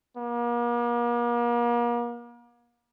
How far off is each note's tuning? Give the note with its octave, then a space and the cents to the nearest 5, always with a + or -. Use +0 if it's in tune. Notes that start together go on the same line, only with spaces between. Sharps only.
A#3 +40